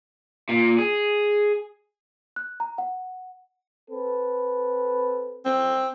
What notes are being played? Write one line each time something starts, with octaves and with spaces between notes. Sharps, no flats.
A#2
G#4
F#6
A#5
F#5
C4 A4 B4
C4